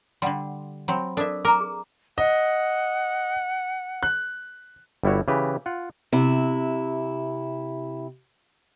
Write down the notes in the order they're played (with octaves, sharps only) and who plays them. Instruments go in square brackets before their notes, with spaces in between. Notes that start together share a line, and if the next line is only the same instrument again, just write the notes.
[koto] D3 G3 [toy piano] F#5 C6
[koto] F#3 C4 [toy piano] B5
[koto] D4 E5 [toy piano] A4 A#4 D5
[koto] A#4 [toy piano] A#5 D6
[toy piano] G#4
[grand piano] D#5 [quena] F#5
[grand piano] F#6
[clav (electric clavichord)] G1 G3 E4 F#4 C#5
C#3 E3 G4 B4
F4 F#5
[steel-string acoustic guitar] C3 E4